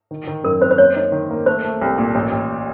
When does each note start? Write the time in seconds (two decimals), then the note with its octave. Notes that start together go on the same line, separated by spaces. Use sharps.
0.11 D#3
0.27 D#3
0.44 F#2 A#4
0.61 C4 C5
0.71 C5
0.78 A#3 C#5
0.96 D#4
1.12 D#3
1.30 A#3
1.46 A3 C5
1.64 A3
1.82 C2
1.98 A#2
2.15 A1
2.32 A1